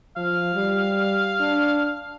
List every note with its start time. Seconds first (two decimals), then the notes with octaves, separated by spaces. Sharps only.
0.17 F3 F5
0.55 G3
1.40 D4